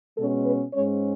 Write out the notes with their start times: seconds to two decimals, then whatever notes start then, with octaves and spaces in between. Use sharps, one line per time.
0.17 B2 G#3 C#4 A4
0.45 B4
0.74 G#2 G#3 C#4 C#5